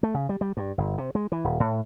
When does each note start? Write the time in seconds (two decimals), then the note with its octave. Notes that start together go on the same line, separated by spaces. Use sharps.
0.03 A3
0.14 C#3
0.29 G3
0.41 G3
0.57 G2
0.78 G1
0.98 C3
1.15 G#3
1.32 E3
1.44 D#1
1.60 A2